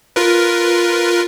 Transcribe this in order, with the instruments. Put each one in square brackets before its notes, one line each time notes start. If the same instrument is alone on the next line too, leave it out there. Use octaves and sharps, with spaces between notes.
[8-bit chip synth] F4 A#4 B4